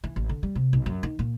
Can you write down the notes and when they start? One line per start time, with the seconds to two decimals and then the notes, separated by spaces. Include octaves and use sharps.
0.04 E3
0.16 A1
0.29 D3
0.43 G3
0.55 C3
0.73 B1
0.86 F#2
1.03 D#3
1.19 A#2